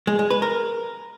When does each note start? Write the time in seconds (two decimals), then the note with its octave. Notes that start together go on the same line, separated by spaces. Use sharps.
0.07 G#3
0.19 G#3
0.30 B4
0.42 A#4